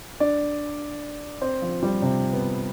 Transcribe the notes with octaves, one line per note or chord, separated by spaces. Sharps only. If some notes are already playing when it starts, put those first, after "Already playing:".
D4 D5
C4 C5
F3 F4
G3 G4
C3 C4
B3